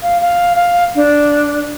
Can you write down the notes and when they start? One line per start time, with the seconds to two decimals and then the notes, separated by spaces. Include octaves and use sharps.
0.03 F5
0.22 F5
0.56 F5
0.96 D4